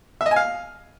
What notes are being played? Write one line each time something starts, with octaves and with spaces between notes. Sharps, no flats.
E5
D#5
G#5
F5